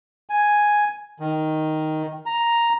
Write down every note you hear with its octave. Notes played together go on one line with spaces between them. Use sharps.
G#5
D#3
A#5